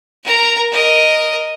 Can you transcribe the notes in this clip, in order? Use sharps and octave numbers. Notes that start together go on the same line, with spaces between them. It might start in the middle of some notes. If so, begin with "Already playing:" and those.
A#4 A#5
A#4 D#5